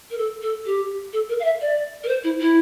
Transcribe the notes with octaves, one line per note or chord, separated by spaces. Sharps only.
A#4
A4
A4
G4
A4
A#4
F5
E5
D5
A#4
C5
E4
E4